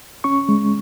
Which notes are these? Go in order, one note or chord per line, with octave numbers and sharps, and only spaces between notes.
C#4 C#6
G#3